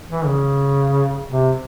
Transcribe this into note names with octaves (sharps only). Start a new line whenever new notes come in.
E3
C#3
C3